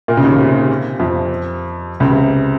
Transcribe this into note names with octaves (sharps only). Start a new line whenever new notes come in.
A#2 A#3
C#3
D#2 D#3
C3
F2 F3
C#2 C#3
C3